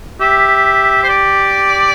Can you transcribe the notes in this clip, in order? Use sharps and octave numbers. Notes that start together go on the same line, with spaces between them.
G4 E5
C5
D5